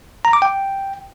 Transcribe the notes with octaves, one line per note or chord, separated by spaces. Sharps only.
A#5
D6
G5